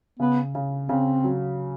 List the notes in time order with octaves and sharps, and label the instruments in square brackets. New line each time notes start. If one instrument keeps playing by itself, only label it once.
[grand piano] C#3 [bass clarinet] B3
[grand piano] C#3
[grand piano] C#3 [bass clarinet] C4
[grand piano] F#3